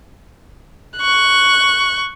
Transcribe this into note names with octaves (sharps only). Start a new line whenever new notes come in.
C#6 F#6